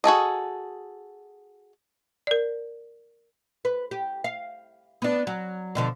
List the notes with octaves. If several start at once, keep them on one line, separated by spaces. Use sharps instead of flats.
F#4 G#4 A4 D#5
A#4 D5
B4
G4
F5
B3 D4
F#3
B2 D3 F3